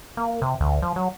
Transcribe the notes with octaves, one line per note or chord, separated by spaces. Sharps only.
A#3
C3
D2
F3
F#3